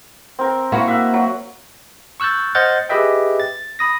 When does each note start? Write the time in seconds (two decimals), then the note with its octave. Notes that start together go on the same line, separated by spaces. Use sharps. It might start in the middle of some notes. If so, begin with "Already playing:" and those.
0.39 C4 A#4
0.72 A#3 E4 F#4
0.88 E5 F#5
1.14 F#3
2.20 C#6 E6 F#6 G6 A6
2.55 C5 D#5 F#5 F6 G6 A6
2.89 G4 G#4 B4 D#5 E5 G5
3.40 A6
3.79 B5 D#6 A#6